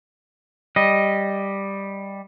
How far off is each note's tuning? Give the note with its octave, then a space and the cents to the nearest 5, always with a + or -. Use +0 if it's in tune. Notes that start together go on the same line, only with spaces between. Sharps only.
G3 +5 D#5 +0